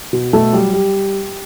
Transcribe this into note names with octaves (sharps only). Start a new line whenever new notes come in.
B2
B2 A3 A4
F#3 G3 G4
G3